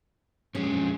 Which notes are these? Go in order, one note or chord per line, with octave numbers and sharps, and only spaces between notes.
F2 G#3 C#4